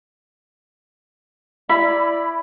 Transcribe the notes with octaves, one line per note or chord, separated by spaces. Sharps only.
E4 D5 B5